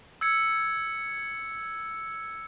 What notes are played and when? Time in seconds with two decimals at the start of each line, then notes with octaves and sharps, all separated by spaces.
0.21 E6 G#6 C#7